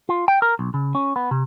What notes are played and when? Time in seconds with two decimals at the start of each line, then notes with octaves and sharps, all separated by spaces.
0.09 F4
0.28 G5
0.42 A#4
0.59 B1
0.74 C#3
0.95 C#4
1.16 B3
1.31 C3